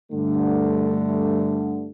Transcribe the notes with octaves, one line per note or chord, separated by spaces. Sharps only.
G2 D3 A3